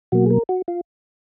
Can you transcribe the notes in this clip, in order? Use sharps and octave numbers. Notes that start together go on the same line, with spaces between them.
B2 F#3 A#3 F#4
G#4
A#4
F#4
F4